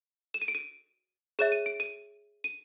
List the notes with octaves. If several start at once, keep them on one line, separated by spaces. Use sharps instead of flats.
E7
D#7
D7
D#7
G#4 C#5 E5 E7
D#7
D7
D#7
D#7